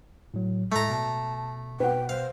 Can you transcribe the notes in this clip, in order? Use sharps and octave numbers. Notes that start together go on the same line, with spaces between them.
A2 F#3
A2 G#3 A3 A4 A#5
B2 A5
B2 B4 F#5 G5
C5 F5